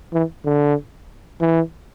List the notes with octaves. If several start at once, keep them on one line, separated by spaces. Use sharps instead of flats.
E3
D3
E3